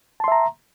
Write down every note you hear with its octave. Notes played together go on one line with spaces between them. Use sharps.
E5 A5 A#5 C6